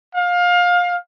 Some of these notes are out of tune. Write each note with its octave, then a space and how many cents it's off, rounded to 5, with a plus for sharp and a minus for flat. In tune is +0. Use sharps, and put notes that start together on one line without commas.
F5 +25